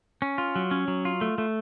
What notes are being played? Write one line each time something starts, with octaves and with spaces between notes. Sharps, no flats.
C#4
F4
F#3
C#4
F#3
F4
A3
A3